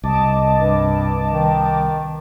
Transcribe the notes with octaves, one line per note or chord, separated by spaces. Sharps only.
C2 D#5 A5 D6
G2
D#3